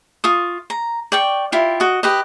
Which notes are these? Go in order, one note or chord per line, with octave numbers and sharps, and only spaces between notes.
F4 C#6 D#6
A#5
D5 G5 C#6
E4 F4 G4
F#4 D#5
G4 B4 D#5